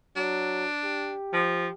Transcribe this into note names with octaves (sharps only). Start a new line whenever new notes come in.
F#3 D4
G4
F3